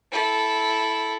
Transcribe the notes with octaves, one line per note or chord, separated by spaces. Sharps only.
E4 A4